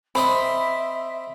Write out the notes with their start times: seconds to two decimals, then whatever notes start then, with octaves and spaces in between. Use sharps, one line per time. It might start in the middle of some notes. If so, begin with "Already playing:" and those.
0.15 C4 C5 D#5 E5 B5